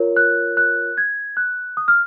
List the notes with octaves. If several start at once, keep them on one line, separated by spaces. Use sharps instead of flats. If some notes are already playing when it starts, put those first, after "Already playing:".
Already playing: F4 A#4 C#5
F#6
F#6
G#6
F#6
D#6
F6